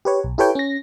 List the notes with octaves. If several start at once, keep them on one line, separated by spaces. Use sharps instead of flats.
G4 B4 C#5
B1
E4 G4 A4 B4 C#5 G5
C#4 A#6